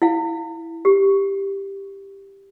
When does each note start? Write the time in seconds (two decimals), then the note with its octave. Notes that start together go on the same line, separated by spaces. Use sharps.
0.02 E4 F5
0.85 G4